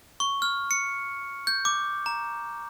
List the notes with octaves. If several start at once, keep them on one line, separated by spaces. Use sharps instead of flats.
C#6
F6
C#7
G6
D6
A#5